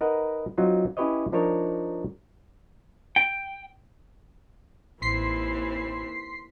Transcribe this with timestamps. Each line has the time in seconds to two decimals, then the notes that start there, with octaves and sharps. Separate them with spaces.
0.01 D#4 A#4 B4 D#5 F#5
0.58 F#3 C4 D#4 F4
0.97 C#4 E4 G4 B4 C#5 D#5
1.32 F3 D4 D#4 A#4 C#5 D#5
3.16 G5
5.02 A1 D#2 E3 C4 C6 B6 C7